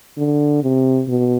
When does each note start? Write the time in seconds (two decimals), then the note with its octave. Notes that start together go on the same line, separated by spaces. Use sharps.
0.18 D3
0.62 C3
1.08 B2